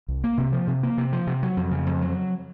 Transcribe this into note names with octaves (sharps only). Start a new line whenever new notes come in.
C2
A#3
C3
F3
C3
A#3
C3
F3
C3
F#3
F2
C#3
F2
F#3